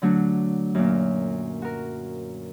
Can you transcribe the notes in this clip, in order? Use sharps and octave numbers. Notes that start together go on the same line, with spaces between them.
D3 F#3 A3 D4
F#2 A#2
F#4 A#4